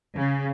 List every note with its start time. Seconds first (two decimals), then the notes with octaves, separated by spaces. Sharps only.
0.15 C#3